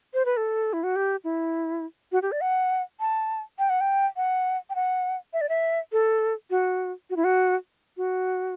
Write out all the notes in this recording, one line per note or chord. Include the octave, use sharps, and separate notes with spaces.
C5
B4
A4
E4
F#4
G4
E4
F#4
G4
D5
F#5
A5
G5
F#5
G5
F#5
G5
F#5
E5
D5
E5
A4
F#4
F#4
E4
F#4
F#4